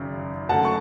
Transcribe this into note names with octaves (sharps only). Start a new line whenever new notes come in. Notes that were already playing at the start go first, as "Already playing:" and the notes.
Already playing: G#1 F#2 C#3
F#2 D3 A3 F#5 A5
C#6